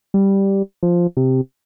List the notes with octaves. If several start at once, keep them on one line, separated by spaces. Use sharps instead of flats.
G3
F3
C3